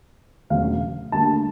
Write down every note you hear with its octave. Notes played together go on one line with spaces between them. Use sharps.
E1 D2 C#3 F#3 F5
D2 D3 G3 A#3 A5